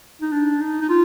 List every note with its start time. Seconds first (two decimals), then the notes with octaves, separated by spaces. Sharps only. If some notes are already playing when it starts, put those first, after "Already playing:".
0.22 D#4
0.32 D4
0.61 D#4
0.81 D#4
0.89 F4